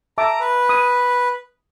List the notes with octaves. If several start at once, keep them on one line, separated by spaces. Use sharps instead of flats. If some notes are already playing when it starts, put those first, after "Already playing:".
E5 A5 A#5 D6
B4
D#6